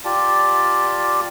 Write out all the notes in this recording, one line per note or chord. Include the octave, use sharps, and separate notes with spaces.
F4 G4 D5 A5